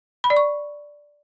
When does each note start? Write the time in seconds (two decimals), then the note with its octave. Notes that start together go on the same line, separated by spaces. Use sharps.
0.24 B5
0.30 D5
0.36 C#6